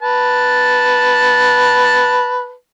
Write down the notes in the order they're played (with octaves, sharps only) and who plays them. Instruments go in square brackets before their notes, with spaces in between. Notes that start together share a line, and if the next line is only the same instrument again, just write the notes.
[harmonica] B4 A5